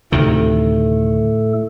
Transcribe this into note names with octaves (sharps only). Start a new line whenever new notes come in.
D2 A2 C3 D#3 A3 A4